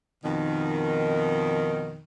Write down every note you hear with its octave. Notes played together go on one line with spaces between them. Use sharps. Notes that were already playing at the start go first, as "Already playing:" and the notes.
F2 B2 D#3